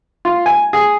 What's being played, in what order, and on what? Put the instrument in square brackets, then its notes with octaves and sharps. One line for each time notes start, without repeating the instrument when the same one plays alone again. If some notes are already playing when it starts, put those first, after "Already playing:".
[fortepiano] F4
G#5
G#4